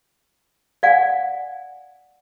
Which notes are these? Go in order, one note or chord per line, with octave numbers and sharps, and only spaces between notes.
D5 F5 F#5 G#5